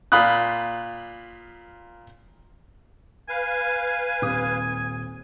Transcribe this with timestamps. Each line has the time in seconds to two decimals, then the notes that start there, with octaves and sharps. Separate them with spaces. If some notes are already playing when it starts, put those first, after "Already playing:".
0.12 A#2 F4 B5 D#6 F#6
3.29 B4 F5 G#5
4.22 D#1 C4 D#6